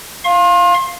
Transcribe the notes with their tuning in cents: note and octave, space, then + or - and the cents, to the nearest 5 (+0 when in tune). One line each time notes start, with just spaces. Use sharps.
F5 +0 C6 +35